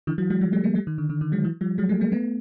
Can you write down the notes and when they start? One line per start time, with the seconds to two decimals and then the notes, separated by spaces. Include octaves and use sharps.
0.07 D3 E3
0.18 E3 F#3
0.30 F#3 G#3
0.41 F3 G3
0.53 G3 A3
0.64 G#3 A#3
0.75 G3 A3
0.87 D#3
0.98 D3
1.10 D3
1.21 D#3
1.32 F#3 G#3
1.44 E3 F#3
1.61 F3 G3
1.78 F#3 G#3
1.89 G3 A3
2.01 G#3 A#3
2.12 A3 B3